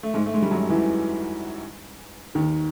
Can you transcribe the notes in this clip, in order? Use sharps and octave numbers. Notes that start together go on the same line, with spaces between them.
A3
G#2 G#3
A3
G#3
G3
F#2 F#3
E2 E3
D#2 D#3